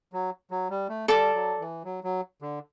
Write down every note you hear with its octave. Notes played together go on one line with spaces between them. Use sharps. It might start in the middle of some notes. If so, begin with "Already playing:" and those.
F#3
F#3
G3
A3
G3 A4 D5 A5 D6
F#3
E3
F#3
F#3
D3